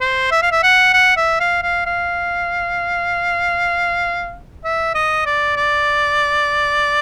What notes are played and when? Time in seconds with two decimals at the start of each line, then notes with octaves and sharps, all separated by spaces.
0.01 C5
0.31 E5
0.42 F5
0.52 E5
0.63 F#5
0.93 F#5
1.17 E5
1.40 F5
1.62 F5
1.86 F5
4.64 E5
4.95 D#5
5.26 D5
5.56 D5